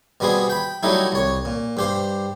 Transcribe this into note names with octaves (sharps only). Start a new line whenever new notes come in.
B2 G3 B3 C4 G#4
G5 B5
F#3 G3 A3 D#4 E4
C2 C#5
A#2
G2 G4 C5